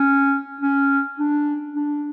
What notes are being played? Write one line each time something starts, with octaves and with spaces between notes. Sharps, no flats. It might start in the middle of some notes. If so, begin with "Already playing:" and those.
Already playing: C#4
C#4
D4
D4